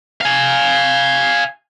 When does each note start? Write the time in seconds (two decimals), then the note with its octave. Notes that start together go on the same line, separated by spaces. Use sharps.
0.21 F5 G#5